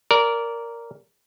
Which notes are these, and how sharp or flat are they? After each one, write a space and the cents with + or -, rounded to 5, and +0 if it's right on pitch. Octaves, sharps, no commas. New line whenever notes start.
A#4 +0 D5 -20